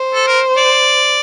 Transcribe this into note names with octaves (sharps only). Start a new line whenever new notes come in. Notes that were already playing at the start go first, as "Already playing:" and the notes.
Already playing: C5
A4
A#4
D5